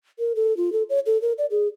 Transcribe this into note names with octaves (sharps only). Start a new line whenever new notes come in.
A#4
A4
F4
A4
C#5
A4
A#4
D5
G#4